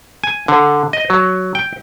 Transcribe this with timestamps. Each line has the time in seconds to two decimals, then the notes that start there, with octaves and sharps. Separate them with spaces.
0.24 G#5
0.48 D3
0.93 D#5
1.10 F#3
1.55 G5